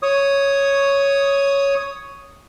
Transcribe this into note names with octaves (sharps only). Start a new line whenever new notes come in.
C#5 D#6